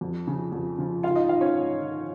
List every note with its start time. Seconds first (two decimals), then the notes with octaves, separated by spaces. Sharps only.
0.01 F2
0.27 C#3 F3
0.52 F2
0.78 C#3 F3
1.03 G#2 F4 F5
1.16 D#4 D#5
1.28 D#3 F4 F5
1.41 C#4 C#5
1.55 G#2
1.80 D#3